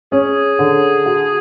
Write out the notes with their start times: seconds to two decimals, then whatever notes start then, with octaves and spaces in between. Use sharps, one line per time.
0.12 C#4 G#4
0.59 D3
1.06 F#4